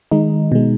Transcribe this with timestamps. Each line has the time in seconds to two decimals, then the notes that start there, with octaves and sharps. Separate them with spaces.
0.11 D#3 G#3 D#4
0.52 B2 G#3